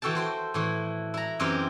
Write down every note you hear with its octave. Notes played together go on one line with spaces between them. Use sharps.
E3 F#4 A4 G5 A5
F#4 C5 G5
A2 E3
E4 A#5
F#2 E3 C4 D#4 G4